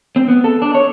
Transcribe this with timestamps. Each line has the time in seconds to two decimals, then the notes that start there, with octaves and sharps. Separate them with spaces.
0.16 C4
0.28 B3
0.44 A4
0.62 D4
0.75 C#5